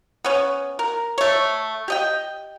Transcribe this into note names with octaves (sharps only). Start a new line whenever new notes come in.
B3 C#4
A#4
A3 C#5
G4 D#5 G5